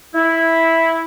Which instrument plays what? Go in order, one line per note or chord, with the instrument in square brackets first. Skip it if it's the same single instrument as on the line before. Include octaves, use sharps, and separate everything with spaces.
[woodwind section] E4